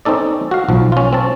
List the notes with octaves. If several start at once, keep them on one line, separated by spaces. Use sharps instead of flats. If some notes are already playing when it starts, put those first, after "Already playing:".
C4 C#4 D#4 A4 D5
F#4 F5
B1 F3
C#4 F4
C4 A5